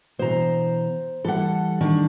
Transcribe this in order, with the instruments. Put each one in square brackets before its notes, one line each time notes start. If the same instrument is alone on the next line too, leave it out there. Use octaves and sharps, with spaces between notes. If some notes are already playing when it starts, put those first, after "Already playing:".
[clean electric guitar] B2 E3 [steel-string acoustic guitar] C5 A#5
[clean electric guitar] E3 G3 [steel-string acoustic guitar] A4 F#5
[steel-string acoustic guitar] D#3 D4